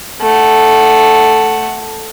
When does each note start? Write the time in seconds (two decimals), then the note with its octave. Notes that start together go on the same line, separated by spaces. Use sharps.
0.21 A3 F#5